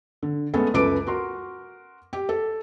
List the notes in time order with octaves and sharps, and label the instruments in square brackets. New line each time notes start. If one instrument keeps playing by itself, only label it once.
[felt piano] D3
G#3 A3 B3 C#4 A4
C#2 F#2 A4 B4 D6 D7
F#4 A#4 C6
G4
A4